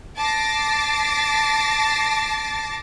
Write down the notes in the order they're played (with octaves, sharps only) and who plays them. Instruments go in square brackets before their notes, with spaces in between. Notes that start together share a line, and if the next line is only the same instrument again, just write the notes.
[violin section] A5 D6 A6 A#6 C7